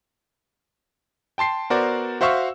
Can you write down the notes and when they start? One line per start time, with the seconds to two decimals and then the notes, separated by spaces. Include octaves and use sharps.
1.38 G5 A5 C6 C7
1.70 B3 F#4 A#4 C5 D5
2.21 F#4 C5 E5 F5 C#6 E6